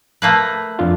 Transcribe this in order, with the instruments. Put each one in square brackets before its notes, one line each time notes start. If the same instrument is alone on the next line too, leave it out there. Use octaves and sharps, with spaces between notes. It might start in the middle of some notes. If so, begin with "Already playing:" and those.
[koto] A3 A#3 B4
[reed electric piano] F2 D4 F4